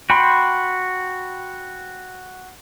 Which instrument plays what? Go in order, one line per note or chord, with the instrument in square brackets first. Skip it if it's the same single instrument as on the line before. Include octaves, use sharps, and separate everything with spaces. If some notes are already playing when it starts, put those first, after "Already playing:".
[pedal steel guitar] F#4 G5 B5 C6